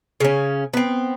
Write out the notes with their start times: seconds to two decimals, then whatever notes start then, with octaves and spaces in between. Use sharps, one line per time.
0.20 C#3 C#4
0.74 B3 C4